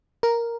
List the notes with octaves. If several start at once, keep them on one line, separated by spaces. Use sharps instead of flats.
A#4